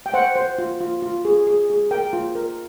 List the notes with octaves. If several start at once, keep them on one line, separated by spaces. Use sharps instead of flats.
G5
C5 F#5
C5
F4
F4
F4
G#4
G#4
G#4
A#4 G5
F4
A#4